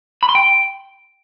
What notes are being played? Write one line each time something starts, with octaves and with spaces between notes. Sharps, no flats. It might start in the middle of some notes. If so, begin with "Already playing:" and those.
B5
C6
G5